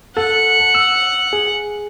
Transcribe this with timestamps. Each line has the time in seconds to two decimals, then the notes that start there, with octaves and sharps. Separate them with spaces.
0.17 A4 F#5 A5
0.75 E6
1.33 G#4